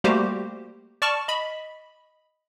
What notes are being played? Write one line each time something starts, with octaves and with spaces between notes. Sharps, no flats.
G3 A3 A#3 F#4 G4 C5
D5 A5 C#6 F6
D#5 B5